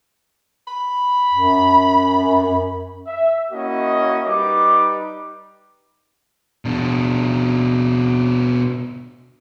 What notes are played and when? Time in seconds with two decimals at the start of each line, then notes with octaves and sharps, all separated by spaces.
0.67 B5
1.34 F#2
3.07 E5
3.52 A#3 C#4 E4 F#4 D#5
4.27 G3 D#4 B4 D6
6.65 B2 D4